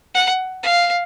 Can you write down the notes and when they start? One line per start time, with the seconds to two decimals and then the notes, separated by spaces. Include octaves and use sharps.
0.15 F#5
0.63 F5